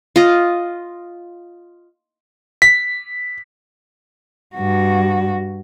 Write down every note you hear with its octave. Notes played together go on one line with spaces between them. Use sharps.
F4 D#5
B6
G2 F#4